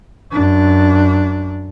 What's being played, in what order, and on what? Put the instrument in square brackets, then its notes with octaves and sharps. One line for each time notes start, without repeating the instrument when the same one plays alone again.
[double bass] F#2 D4